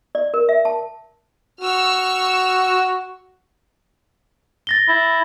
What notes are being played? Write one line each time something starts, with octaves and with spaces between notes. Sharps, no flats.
D5
A#4
E5
A5
F#4 C#6 E6 F6
A6 A#6 G7
E4